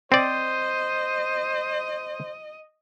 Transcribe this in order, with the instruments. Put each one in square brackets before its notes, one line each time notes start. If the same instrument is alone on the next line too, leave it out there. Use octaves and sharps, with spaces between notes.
[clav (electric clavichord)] C4 D5 [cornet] C5 [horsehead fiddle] D#5